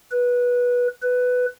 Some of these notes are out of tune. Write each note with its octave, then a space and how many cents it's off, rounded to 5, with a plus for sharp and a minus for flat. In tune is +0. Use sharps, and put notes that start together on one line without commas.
B4 -15
B4 +10